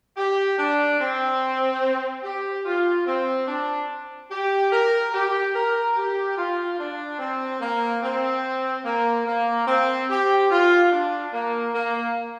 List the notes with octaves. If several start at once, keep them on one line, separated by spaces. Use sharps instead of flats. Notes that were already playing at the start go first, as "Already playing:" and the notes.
G4
D4
C4
G4
F4
C4
D4
G4
A#4
G4
A#4
G4
F4
D4
C4
A#3
C4
A#3
A#3
C4
G4
F4
D4
A#3
A#3